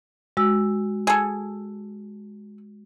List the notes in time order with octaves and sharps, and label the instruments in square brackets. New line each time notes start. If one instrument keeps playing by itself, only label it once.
[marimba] G#3 F#4 E6
[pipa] G#4 A4